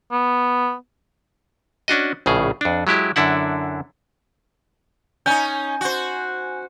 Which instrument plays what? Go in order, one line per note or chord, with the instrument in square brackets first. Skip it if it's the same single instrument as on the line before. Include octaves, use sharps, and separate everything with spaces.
[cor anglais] B3
[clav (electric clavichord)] C#4 D4 F#4 D#5
A#1 A2 C#3 G#4
F2 D4
F#3 G#3 E4 G4
F#2 D3 D4 E4 F#5
[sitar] C#4 D#4 [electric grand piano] G#5 G6
[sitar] F#4 C5